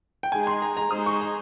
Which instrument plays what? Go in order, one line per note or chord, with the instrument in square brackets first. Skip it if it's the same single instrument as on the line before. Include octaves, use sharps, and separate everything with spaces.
[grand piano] G5
[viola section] G#3 D#4 G#4 [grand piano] G#5
[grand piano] C6
A#5
A#5
[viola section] G#3 D#4 G#4 C5 [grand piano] D#6
[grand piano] C#6
A#5